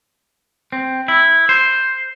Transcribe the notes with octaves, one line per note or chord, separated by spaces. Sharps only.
C4
E4
C5